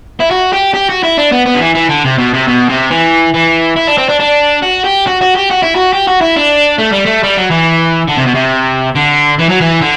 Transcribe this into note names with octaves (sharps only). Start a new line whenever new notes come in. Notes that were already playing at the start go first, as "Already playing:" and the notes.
E4
F#4
G4
G4
F#4
E4
D4
B3
B3
D3
E3
E3
D3
C3
B2
C3
B2
C3
E3
E3
E4
D4
C4
D4
D4
F#4
G4
F#4
F#4
G4
F#4
E4
F#4
G4
F#4
E4
D4
A3
G3
A3
G3
F#3
E3
D3
C3
B2
C3
D3
E3
F#3
E3
D3